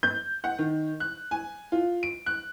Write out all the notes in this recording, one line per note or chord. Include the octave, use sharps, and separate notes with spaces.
G6
F#5
D#3
F#6
G#5
F4
D7
F#6